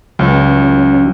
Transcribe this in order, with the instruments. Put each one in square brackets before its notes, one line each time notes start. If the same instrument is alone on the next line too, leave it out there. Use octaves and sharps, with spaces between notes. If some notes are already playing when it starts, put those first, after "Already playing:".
[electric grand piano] C#2 [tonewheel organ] F#3 C#4